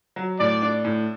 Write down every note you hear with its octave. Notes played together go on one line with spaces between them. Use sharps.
F#3
A2 D5
D4
A2